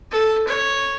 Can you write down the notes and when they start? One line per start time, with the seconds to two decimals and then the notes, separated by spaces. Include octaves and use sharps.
0.11 A4
0.47 C#5